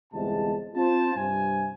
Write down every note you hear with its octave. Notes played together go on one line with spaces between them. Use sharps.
G1 E2 C3 G#3 A5
C4 F4 C5 A5
G2 C3 G#5